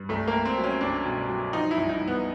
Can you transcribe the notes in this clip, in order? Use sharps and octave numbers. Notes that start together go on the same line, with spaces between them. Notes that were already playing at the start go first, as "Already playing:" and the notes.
Already playing: G2
C2 A3
A#3
C2
C4
F#3
C#4
C2 D4
B2
F#3
F3 D#4
E4
C2
D#4
C2
B3